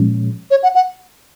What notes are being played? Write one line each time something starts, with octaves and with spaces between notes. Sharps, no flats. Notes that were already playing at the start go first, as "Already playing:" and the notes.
Already playing: A#2 F3 G#3 C#4
C#5
F#5
F#5